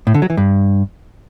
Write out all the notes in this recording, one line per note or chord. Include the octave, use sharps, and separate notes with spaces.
A2
D3
F#3
E3
G2